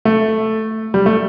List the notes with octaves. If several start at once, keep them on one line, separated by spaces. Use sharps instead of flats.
A3
G3
A3